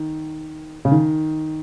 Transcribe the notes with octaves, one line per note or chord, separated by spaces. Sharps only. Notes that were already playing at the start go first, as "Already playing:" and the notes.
Already playing: D#3
C#3
D#3